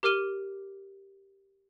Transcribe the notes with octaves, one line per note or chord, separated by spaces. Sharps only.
G4 A#4 D6 F6 D#7 G7